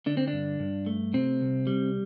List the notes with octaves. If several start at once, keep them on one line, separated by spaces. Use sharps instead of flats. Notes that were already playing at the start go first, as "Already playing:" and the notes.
D3 D4
C4
D4
G2
G2
A3
C3 C4
C2
G3